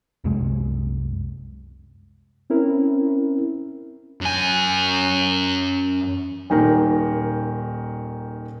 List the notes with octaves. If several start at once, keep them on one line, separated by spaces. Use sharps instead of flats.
C2 F#2 C3 G#3
C4 C#4 E4 A#4
F#2 G#5
D#1 D#3 A#4